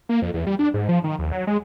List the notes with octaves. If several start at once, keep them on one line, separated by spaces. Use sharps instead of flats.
A#3
F2
E2
G3
D4
G#2
F3
D#3
D#2
F#3
G#3